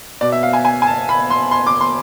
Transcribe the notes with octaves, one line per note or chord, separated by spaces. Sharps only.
B2 D5
E5
F5
G#5
G#5
G#5
A5
B5
C6
C6
D6
C6